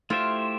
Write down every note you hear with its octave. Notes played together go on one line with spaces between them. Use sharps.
A3 E4 F4 G4 C5 E5